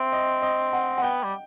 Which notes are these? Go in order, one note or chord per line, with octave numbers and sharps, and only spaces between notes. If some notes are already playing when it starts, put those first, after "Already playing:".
Already playing: C4 E5
D#5
D#5
F#5
F#5
B3 G5
G3